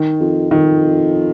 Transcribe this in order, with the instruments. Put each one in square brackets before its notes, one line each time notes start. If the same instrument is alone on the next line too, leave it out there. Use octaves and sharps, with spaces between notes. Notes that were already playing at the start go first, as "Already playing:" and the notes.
Already playing: [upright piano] D#3
[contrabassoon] F2
[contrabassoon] F2 [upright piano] D#3